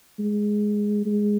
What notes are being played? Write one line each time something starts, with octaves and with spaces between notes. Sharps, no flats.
G#3
G#3